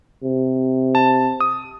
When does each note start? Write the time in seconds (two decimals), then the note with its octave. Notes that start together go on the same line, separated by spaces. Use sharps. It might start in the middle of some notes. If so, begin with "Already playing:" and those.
0.24 C3
0.95 A5
1.40 D#6